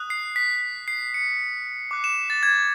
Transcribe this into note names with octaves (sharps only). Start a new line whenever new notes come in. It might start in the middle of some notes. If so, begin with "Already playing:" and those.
Already playing: D#6 F#6
C7
B6
C7
C#7
D6 F#6
E7
A6
G#6